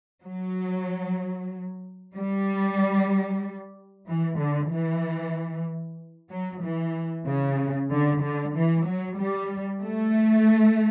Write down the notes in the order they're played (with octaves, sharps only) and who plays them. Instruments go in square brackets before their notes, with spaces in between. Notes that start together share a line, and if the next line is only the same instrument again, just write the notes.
[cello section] F#3
G3
E3
D3
E3
F#3
E3
C#3
D3
D3
E3
F#3
G3
A3